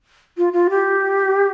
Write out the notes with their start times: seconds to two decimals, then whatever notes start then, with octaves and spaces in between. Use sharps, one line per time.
0.37 F4
0.52 F4
0.69 G4